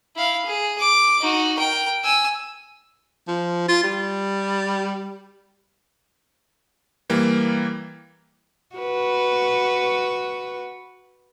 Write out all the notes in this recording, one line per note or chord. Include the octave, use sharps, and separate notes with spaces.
E4 F5
G#4
D6
D#4 F#4
A#4 G5
G#5 E6
F3
F4
G3
E3 G3 A#3
F#4 B4